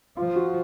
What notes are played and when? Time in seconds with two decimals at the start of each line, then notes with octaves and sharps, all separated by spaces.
0.17 F3 F4
0.36 F#4